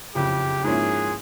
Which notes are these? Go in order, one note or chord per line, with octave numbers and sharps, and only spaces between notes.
F#1 F2 C#3 G4
G#2 F3 A#3 C#4 E4 G#4